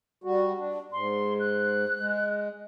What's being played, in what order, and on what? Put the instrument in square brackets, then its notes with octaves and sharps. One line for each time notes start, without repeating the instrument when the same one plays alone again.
[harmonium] G3 F#4
D4
[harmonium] G#2 [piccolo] C6
[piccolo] F#6
[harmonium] G#3